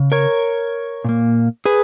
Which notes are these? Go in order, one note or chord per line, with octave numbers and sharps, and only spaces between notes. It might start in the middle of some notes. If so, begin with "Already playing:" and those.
Already playing: C#3
A#4 C#5
A#2 A#3
G#4 B4